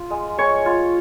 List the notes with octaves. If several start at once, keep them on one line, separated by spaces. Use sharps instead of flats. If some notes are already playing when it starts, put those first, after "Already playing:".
Already playing: F4
G#3
G#3 C#5 C#6
F4